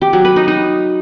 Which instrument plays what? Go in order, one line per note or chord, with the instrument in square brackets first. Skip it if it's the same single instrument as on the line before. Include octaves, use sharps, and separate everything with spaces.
[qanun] G4
F#3
B4
D#4
D#4